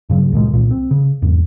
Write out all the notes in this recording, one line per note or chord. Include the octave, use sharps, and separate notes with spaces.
G2 C#3 F#3
C#2 A#2 D#3 G#3
C2 A#2
C4
C#3
E2 G#2